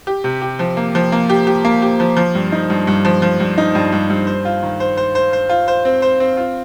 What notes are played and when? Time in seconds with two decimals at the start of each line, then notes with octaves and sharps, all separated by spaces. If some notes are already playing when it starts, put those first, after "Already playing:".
0.07 G4
0.24 C3
0.42 G4
0.59 F3
0.77 A#3
0.95 F3
1.12 A#3
1.30 G4
1.47 G4
1.65 A#3
1.82 G4
2.00 F3
2.17 F3
2.35 G2
2.52 D#4
2.70 G2
2.87 G2
3.05 F3
3.22 F3
3.40 G2
3.58 D#4
3.75 G2
3.92 G2
4.10 G2
4.27 C5
4.45 F4
4.63 D#3
4.80 C5
4.97 C5
5.15 C5
5.33 C5
5.49 F4
5.68 C5
5.85 C4
6.02 C5
6.20 C4
6.37 F4